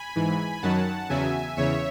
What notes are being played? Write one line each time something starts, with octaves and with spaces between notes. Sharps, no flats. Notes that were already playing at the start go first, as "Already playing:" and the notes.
Already playing: G#5 B5
G#2 E3
F#2 D#3 F#3 F#5 A5
E2 C#3 F#3 E5 G#5
E2 C#3 C#5 E5